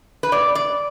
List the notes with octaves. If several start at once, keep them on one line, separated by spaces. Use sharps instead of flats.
B4
A#2 D5
D5